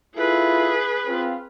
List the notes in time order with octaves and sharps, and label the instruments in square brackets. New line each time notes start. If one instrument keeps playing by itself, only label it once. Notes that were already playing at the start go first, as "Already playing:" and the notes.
[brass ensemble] E4 F4 A4 [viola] G#4 B4
[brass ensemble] C4 F4